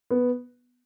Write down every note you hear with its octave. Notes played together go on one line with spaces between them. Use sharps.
B3